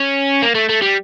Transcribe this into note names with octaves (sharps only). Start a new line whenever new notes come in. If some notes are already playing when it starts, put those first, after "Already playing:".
Already playing: C#4
A#3
A3
A3
G3